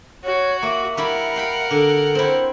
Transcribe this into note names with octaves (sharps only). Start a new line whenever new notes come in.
F#4 C#5
A#3 E5
G3 E4 A#4 F#5 B5
F5 G5 B5
D3
C4 E4 C5